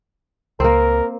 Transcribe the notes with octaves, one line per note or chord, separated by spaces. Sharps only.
C#2 A#3 C4 A#4